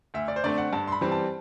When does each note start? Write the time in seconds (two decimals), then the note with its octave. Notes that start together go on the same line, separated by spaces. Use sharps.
0.14 D2 E5
0.28 D5
0.36 C5
0.44 D3 A3 C4 D5
0.58 F#5
0.73 G2 A5
0.87 C6
0.92 B5
1.01 E3 G3 C4
1.12 A5